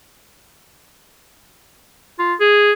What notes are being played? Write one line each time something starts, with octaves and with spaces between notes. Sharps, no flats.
F4
G#4